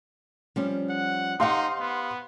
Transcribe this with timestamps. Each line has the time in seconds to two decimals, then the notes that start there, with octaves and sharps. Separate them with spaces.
0.56 F3 G3 C#4
0.89 F#5
1.40 D#4 G4 C5 F5 F#5 C6
1.80 B3